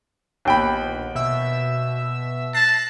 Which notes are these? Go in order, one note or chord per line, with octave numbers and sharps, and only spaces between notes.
A#1 D#2 B3 G5 B5
B2 E5 E6
A5 F#6 A#6 C7